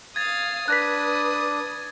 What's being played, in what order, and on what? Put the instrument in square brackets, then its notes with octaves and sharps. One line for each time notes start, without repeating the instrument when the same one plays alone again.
[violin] F5 D#6 [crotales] G#6 A6
[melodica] D4 [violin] B4 D#6 [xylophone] F#6 A#6 B6